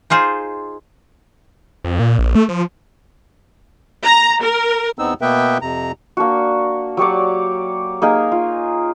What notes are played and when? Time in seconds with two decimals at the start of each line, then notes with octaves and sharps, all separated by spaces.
0.10 D#4 F4 G#4 C5
1.85 F2
2.00 A#2
2.19 A#1
2.35 A3
2.49 F3
4.04 A#5
4.43 A#4
4.99 E2 B3 C4 D#4 E6
5.21 B2 A#3 B3 B4 E5 G5
5.62 F2 C3 A#5
6.17 A#3 D4 F#4
6.97 F#3 G4 C#5 D5
8.02 A#3 D#4 G#4 A#4
8.32 F4